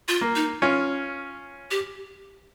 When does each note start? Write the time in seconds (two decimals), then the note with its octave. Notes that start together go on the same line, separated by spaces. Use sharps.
0.08 F4
0.21 A#3
0.36 D#4
0.62 C#4 F4
1.71 G4